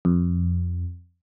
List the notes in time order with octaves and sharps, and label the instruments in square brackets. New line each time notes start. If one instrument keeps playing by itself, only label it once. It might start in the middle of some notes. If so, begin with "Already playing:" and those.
[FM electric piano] F2